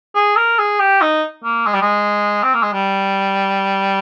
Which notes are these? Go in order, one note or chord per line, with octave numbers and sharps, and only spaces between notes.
G#4
A#4
G#4
G4
D#4
A#3
G#3
G3
G#3
C4
A#3
G#3
G3